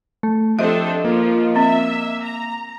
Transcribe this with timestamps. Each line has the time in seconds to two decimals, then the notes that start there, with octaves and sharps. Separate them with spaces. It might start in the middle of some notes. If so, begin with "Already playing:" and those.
0.23 A3
0.59 F3 C4 D4 G4 A4 C5 D#5 E5
1.05 F3 A#3 F4
1.56 C4 E5
2.23 A#5